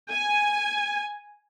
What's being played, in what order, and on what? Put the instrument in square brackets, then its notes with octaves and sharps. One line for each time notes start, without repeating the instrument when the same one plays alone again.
[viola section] G#5